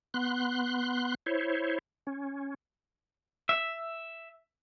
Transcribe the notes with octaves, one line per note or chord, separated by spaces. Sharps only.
B3 C6 F#6
E4 C5 C#5
C#4
E5